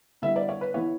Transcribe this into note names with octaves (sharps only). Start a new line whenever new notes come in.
D3 G3 B3 E4 E5
D5
C#5
B4
E3 B3 E4 C#5